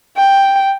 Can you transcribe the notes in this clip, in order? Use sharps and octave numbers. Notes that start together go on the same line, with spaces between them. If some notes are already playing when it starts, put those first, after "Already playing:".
G5